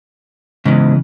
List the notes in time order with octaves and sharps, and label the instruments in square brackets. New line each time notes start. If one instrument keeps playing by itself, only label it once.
[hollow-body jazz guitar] E2 G#2 [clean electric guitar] C#3 E3